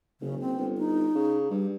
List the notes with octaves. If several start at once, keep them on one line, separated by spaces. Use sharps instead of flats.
F#1 C#3
C4
G1
D#4
C#3
G2 G3